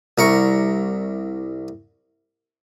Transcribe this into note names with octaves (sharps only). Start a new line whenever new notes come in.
C2 A#4 C#6